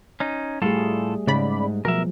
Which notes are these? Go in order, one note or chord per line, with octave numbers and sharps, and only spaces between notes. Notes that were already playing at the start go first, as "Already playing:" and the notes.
C#4 D#4
A2 G3 A3 F4 G#4 A4
G#2 C#3 D5 B5
B2 F3 F#3 A#4 E5